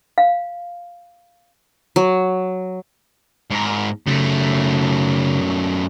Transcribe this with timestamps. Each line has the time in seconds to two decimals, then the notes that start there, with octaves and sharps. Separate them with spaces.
0.18 F5
1.96 F#3
3.50 G#2 A#4
4.06 F#2 C#3 A3